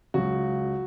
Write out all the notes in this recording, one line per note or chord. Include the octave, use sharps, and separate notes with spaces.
C#2 C#3 F#3 F#4